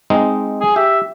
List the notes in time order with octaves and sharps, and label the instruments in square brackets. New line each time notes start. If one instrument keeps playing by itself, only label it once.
[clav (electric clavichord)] G#3 C4 D#4
[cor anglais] G#4
[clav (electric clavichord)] G4 [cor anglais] E5